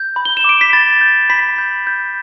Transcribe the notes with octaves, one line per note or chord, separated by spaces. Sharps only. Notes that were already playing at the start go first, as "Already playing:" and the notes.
Already playing: G6
B5
G7
E7
D6 D7
B6
B5 A6
G6
B5 B6
G6
G6